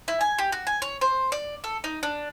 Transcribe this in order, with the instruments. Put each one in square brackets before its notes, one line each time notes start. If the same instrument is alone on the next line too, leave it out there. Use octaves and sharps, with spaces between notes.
[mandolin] E4
G#5
G4
F#4
G#5
C#5
C5
D5
A4
D#4
D4